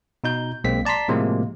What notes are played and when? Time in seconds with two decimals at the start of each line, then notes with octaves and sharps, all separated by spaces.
0.24 B2 D#4 G6
0.64 B1 G#3 A#3 C4 B6
0.85 D5 A5 A#5 C6 B6
1.08 A2 C3 F3 G#3 A#3